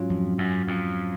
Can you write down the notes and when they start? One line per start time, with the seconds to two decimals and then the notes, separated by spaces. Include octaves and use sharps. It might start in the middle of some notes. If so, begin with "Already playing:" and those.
Already playing: G#2 F#3 C#4 F4
0.10 F2
0.38 F#2
0.68 F2